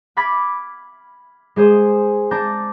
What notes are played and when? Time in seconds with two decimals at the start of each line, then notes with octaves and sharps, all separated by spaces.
0.17 B5 D6 F6 G#6 A6 B6
1.56 G#3 G#4 C5 D#6
2.31 D4 A5 A#5 G6 A6